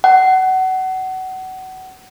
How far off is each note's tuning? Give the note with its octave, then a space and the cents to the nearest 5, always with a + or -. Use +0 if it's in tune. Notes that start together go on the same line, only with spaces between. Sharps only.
F#5 +25